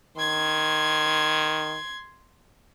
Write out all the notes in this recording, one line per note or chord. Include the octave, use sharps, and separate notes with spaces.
D#3 C6 G#6